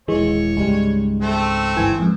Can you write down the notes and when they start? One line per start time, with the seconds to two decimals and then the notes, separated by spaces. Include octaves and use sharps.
0.08 D#1 E3 G#3 C#5
0.57 C#2 G#2 G3 G#3
1.22 A3 C4
1.76 G1 E3 G#5
1.99 F2 G#2